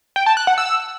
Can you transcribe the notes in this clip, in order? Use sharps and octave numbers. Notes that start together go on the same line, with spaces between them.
G5
A5
F#6
F#5
E6